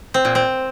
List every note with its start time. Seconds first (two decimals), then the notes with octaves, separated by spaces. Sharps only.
0.14 C4
0.25 A#2
0.35 C4